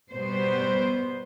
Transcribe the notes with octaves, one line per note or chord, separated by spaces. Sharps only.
B2 G3 B3 C5